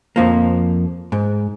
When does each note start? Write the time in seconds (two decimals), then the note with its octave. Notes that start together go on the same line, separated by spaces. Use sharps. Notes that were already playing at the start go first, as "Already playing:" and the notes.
0.16 F2 F3 A#3
1.12 G#2